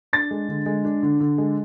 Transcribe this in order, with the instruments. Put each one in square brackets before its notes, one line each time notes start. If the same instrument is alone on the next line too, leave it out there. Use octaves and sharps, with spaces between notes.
[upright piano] D4 A6
G#3
D3
G#3
D4
D3
D3
G#3